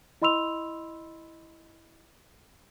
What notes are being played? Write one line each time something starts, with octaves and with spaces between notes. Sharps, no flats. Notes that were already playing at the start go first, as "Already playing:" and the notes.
E4 D#5 B5 C6 E6 F7